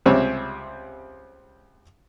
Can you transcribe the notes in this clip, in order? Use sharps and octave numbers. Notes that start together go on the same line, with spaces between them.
C#2 C3 G3 C4 C#5 E5